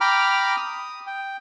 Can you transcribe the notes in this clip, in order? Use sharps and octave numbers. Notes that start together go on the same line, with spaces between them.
G5 A#5 B5 D6 F6
D#6
G5